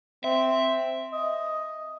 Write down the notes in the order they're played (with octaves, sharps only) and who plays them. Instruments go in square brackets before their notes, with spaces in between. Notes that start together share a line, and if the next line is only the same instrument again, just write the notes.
[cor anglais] C4 [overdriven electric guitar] E5
[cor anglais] D#5